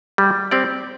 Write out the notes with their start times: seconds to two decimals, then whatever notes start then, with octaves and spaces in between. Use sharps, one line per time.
0.18 G3
0.51 C4 G4 D5